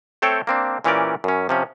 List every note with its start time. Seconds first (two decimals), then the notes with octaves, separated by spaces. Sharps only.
0.22 A3 C4 A4 C5 C#5 G5
0.47 A#3 C4 D4
0.84 A#2 E3 C#4 G4 A#4 D5
1.24 F#2 C#4
1.49 C3 F3 C#4